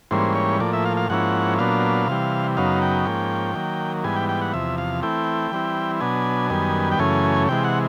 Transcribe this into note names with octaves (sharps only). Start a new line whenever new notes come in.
G#2 E3 G3 A#3 C#4 C5
C#5
A2 F3 A#3 D5
E5
F5
F5
G#2 F3 A#3 C#4 E4 F#5
A#2 F#3 B3 D4 F5
C3 E3 G3
F#2 C#3 F#3 B3 D#4 F5
G5
G#2 F3 A#3 C#4
D#3 F#3 A#3
G#2 E3 G3 B3 G#5
G5
G5
F#5
E2 C3 F3 E5
F5
E3 A3 C4 E4 G5
E3 G3 C4 E4
B2 F#3 B3 D4 G#5
F#2 D#3 G3 B3
G5
F#2 C#3 E3 A3 C#4 G#5
C3 E3 G#3 G5
F#5